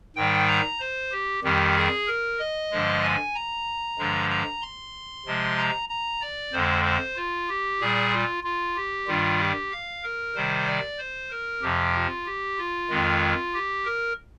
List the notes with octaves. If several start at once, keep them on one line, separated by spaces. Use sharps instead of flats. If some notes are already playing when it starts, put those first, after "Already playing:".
G#2 D#3 G3 G5
A#5
C5
G4
F2 D#3 G3 G4
G#4
A#4
D#5
G2 D3 F3 G#3
G#5
A#5
G2 D3 F3 G#3
A#5
C6
C3 F3 G#3
A#5
A#5
D5
F2 D3 G#3 C5
C5
F4
G4
A#2 G3 G#4
F4
F4
G4
G2 D#3 G3 F4
G4
F5
A#4
C3 D#3 G3 C5
D5
C5
A#4
F2 C3 F3 G4
F4
G4
F4
F2 D#3 G#3
G4
A#4